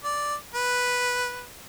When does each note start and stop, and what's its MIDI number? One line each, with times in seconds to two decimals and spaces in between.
0.04 0.35 74
0.55 1.48 71